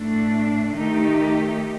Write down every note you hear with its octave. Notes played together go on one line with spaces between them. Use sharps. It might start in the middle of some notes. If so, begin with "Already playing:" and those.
Already playing: A2 A3 D4
D#3 A3 D#4 G4